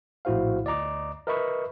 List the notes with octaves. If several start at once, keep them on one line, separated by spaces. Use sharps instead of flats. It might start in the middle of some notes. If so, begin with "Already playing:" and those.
A#1 A2 E4 F#4 C5 F5
D2 D5 D#5 A#5 D6
A#4 B4 D#5 E5 B5 C#6